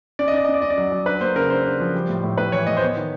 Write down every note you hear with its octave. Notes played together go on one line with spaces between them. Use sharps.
C#4 D5
D#5
C#4 D5
D#5
C#4
D5
C#4 D#5
D5
F#3
F#3
D4 B4
A#3 C5
C#3 A#4
D4 C5
D4
F3
G3
A2
A2
A2 B4
E3 C#5
A2 D#5
C5
B3 C#5
D#3